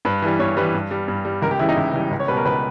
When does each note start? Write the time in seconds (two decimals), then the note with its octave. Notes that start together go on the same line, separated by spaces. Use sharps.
0.05 G2 B4
0.22 E3 G3
0.39 G2 C#5
0.57 E3 G3 B4
0.74 G2
0.91 G3
1.08 G2
1.25 G3
1.42 C#2 A#4
1.51 G4
1.59 C#3 E3 G3 E4
1.69 D#4
1.77 C#2 E4
1.93 C#3 E3 G3
2.11 C#2
2.20 C#5
2.28 B2 G3 B4
2.37 A#4
2.45 C#2 B4